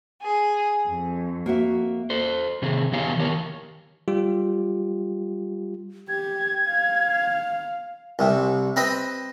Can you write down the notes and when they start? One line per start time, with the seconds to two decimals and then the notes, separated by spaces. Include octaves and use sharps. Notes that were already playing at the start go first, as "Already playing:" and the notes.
0.23 G#4
0.87 F2
1.46 A#3 F#4 E5
2.10 A4 C5
2.62 C3 D#3 C4 G#4
2.92 E3 B3 G4 C#5 F5 G#5
3.17 D#3 E3 G4 A#4 C#5
4.08 G3 F4 G4
6.09 G4 G#6
6.70 F5
8.19 C2 C3
8.76 C4 B4 D#5 B5